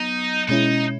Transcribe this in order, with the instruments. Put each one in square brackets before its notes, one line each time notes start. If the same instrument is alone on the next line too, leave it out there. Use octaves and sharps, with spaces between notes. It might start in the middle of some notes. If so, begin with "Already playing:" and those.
Already playing: [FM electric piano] F#3 B3 [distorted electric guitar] D#4
[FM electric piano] B2 G#3 C#4 E4 [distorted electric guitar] D#4